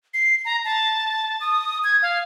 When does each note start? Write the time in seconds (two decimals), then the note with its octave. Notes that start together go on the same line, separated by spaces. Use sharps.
0.14 C7
0.45 A#5
0.64 A5
1.41 D#6
1.84 G#6
2.02 F5